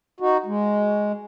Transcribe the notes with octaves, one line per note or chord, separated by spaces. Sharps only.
D#4 F#4
G#3